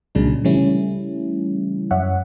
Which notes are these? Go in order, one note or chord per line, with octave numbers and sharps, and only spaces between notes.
C2 A#2 C#3 F#3 G#3 D4
C#3 E3 G3 A3 C#4 E4
F#2 C#5 E5 F#5